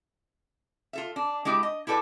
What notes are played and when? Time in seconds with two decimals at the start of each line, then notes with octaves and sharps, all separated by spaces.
0.93 F4 A4 E5
1.16 D4
1.45 G#3 D4 E4 G4
1.63 D#5
1.87 E4 G4 A4 B4 D5